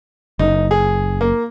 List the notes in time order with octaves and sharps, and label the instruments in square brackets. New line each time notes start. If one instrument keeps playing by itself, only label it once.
[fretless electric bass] F#1 [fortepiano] D#4
[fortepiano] G#4
A#3